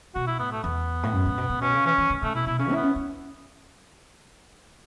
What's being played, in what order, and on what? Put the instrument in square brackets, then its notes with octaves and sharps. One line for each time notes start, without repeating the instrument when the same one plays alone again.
[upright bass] B2 [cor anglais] F#4
[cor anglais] E4
[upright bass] A2 [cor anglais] B3
[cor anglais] A3
[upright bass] E2 [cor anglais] B3
[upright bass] A2
F#2
A2
B2
A2
[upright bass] B2 [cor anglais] C#4
[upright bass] C#3
[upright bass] E3 [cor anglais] C#4
[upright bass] E3
C#3
[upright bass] C#3 [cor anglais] A3
[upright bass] B2 [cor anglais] E4
[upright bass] B2 [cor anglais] E4
[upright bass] C#3 [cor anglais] C#4
[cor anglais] B3 [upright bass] E4
[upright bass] C#4
C#4